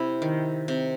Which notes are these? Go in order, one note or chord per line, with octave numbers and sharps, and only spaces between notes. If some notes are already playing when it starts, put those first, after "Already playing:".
Already playing: C3 E4
D#3
C3